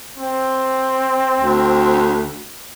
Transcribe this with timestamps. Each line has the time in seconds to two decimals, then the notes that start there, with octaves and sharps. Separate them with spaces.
0.18 C4
1.36 D2